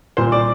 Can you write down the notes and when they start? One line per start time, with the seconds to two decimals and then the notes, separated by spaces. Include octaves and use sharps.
0.17 C2 A#2 C5 C6
0.32 D5 D6